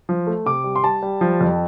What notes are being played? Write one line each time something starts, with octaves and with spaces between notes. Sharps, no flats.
F3
A3
C3 D6
G3
C6
G3 A5
G3
F3
F2